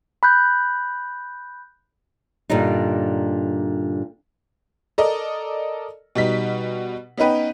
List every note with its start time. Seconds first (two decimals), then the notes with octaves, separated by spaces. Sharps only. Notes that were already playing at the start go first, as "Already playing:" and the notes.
0.23 B5 F#6 G6
2.50 G2 A#2 D3 G3 D#4
4.98 A4 A#4 D5 D#5
6.15 B2 G3 D#4 B6
7.17 B3 C#4 D#4 B4 G5